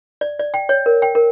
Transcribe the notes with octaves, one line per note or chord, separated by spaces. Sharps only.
D5
D5
G5
C#5
A#4
G5
A#4